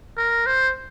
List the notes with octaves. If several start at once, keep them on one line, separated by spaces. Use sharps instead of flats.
A#4
C5